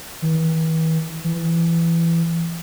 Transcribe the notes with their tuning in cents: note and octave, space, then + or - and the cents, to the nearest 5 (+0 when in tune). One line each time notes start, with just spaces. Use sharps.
E3 -40
E3 +20